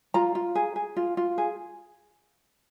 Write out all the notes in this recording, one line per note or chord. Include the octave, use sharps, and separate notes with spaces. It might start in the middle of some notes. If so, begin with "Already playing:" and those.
F4 A#5
F4
G#4
G#4
F4
F4
G#4